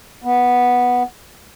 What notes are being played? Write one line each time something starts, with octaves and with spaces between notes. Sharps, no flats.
B3